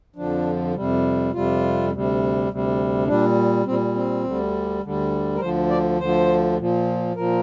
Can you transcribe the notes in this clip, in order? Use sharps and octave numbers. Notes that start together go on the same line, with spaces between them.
F2 D3 F3 D4
F2 C3 G3
F2 C3 G3 F4
D2 C3 G3
D2 C3 G3
A#2 G3 D4
A#2 G3 C4
C4
D2 D3 G3
D2 D3 G3
A#4
D2 D3 F3 C5
D5
D2 D3 F3 C5
A#2 F3
A#2 F3 A#4